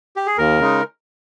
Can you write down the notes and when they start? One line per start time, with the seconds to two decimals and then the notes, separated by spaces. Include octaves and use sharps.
0.16 G4
0.26 G#4
0.38 D#2 A#4
0.60 C#3 G#3 D#4